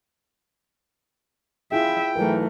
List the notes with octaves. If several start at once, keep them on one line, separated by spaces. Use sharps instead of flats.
E4 F4 G#4 E5 G5
G#2 E3 F#3 A3 A#4